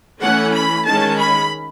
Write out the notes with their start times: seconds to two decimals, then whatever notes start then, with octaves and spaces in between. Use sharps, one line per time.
0.20 E3 A3 C#4 F#5
0.53 B5
0.85 D#3 G#3 C#4 A5
1.18 B5